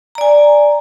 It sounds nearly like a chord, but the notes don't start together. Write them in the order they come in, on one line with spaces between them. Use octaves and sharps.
A#5 D5 G#5